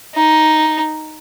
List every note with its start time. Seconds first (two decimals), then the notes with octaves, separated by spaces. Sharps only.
0.15 D#4